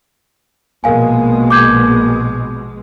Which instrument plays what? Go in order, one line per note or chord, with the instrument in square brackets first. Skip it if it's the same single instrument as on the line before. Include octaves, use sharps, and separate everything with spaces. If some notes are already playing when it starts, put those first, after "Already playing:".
[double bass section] A#1 B2 G#3 [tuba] A#3 [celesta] A#4 F5 G#5
[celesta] D6 G6 G#6